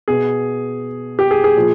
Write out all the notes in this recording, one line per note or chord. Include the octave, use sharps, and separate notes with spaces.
B2 G#4
G4
G#4
G#4
A#2 F3